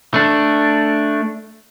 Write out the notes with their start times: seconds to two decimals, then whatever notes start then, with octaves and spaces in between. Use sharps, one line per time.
0.14 A3 D4